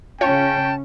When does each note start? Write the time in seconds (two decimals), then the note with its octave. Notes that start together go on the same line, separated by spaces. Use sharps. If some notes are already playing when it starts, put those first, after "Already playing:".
0.21 C#3 C#4 F4 C#5 G5 A5